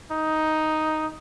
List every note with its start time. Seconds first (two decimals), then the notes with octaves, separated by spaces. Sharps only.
0.11 D#4